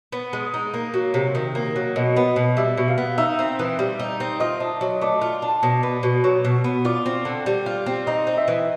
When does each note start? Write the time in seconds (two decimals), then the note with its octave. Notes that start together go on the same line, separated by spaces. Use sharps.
0.12 B3
0.33 G#3
0.54 D#4
0.74 A#3
0.94 F#3
1.14 C3
1.35 D#3
1.55 A#3
1.76 F#3
1.96 B2 D#5
2.16 B3
2.36 B2
2.57 G3 E5
2.77 B2
2.88 F5
2.98 B3
3.18 D#4 E5
3.39 C4
3.59 E3
3.79 G3
4.00 D#4
4.20 C4
4.40 F4 D#5
4.60 D4
4.81 F#3
5.01 A3 D5
5.21 F4
5.42 D4
5.63 B2
5.83 B3
6.03 B2
6.24 F#3 C#5
6.45 B2
6.64 B3
6.85 F4 D5
7.06 C4
7.25 D3
7.46 G3
7.66 F4
7.86 C4
8.06 D#4 D#5
8.27 C4
8.37 E5
8.48 E3